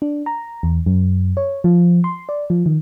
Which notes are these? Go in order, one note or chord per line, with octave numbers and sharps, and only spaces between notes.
D4
A#5
E2
F#2
C#5
F3
C6
D5
F3
D#3